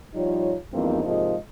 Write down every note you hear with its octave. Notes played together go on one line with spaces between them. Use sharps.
F3 G3 D#4 F4 C#5
E2 G2 F3 A#3 C4 D#4
G#2 C3 F3 G#3 A#3 D#5